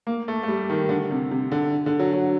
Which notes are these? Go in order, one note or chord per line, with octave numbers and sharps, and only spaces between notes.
A#3
A3
A3
G3
D#3
D3
C3
C3
D3
D3
F#3
F#3